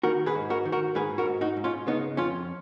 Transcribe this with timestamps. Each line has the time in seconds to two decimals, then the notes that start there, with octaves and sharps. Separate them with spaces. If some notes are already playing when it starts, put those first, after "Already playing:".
0.03 D#3 F#4 A#4
0.26 G#4 B4
0.35 G#2
0.50 F#4 A#4
0.65 D#3
0.72 F#4 A#4
0.95 G#2 G#4 B4
1.18 F#4 A#4
1.26 G#2
1.41 D#4 F#4
1.57 G#2
1.64 C#4 F4
1.87 C#3 B3 D#4
2.17 F2 C#4 F4